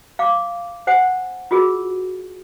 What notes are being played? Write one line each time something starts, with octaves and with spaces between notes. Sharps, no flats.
F5 D6
C5 F#5 G#5
F4 F#4 G#4 A#4